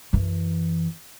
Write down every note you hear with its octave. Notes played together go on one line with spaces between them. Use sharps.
F#2 E3